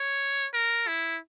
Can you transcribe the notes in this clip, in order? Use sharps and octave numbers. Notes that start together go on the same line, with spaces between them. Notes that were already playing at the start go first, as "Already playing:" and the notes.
Already playing: C#5
A#4
E4